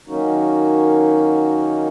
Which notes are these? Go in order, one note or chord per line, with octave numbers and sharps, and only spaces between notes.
D#3 F#3 A#3 C#4 D#4 F#4